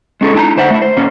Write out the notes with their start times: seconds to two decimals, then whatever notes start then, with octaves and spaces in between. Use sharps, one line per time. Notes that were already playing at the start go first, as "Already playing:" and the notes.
0.21 G#3 C#4 G#4 A4
0.35 D4 E4 A5 A#5
0.57 D2 C5 E5 F#5
0.70 A3 E4
0.82 C5
0.97 A#2 A#3 C#4